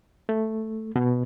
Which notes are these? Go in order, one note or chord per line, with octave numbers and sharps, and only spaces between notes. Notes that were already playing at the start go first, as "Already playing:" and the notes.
A3
B2